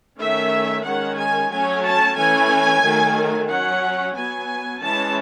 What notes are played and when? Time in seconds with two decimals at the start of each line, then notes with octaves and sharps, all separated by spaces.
0.19 D#3 A3 C#4 E5
0.85 D#3 G#3 C#4 F#5
1.17 G#5
1.50 F#3 A3 C#4 G#5
1.84 A5
2.16 E3 A3 C#4 G#5
2.83 D#3 F#3 A3
3.48 F#3 C#4 F#5
4.14 F#3 B3 G#5
4.80 E3 G#3 C#4 A5